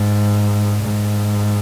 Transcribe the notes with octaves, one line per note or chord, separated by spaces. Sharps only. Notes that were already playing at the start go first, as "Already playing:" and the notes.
Already playing: G#2
G#2